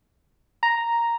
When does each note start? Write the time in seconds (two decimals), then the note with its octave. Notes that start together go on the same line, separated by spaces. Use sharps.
0.63 A#5